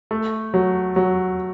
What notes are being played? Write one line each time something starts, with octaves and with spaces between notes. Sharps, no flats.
A3
F#3
F#3